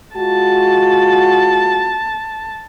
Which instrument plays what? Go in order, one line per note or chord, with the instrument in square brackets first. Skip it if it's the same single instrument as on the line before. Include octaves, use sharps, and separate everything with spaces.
[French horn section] G#3 F4 F#4 [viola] A5